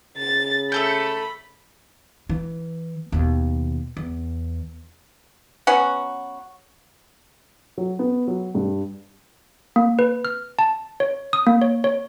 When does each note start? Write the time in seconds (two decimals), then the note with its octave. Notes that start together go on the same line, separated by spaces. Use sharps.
0.17 C#3 A6
0.72 A3 A4 B5 G6
2.29 E3
3.12 D#2 B2
3.97 E2
5.67 F#3 B3 C#4 F#4
7.78 F#3
7.99 B3
8.28 F#3
8.55 G2
9.76 A#3
9.99 B4
10.25 F6
10.59 A5
11.00 C#5
11.33 D#6
11.47 A#3
11.62 C#5
11.84 C#5